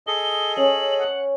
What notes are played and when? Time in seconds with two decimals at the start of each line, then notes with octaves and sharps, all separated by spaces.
0.07 G#4 A4 D#5 G7
0.57 C#4 F#7
0.98 F#5